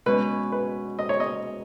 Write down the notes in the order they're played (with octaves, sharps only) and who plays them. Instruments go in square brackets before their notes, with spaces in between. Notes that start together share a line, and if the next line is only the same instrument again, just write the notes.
[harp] B2 G#3 C#4 [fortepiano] B4
[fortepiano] B4
D#5
C#5
D#5